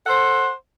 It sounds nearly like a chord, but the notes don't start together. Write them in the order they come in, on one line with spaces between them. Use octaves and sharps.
F#5 A4 C5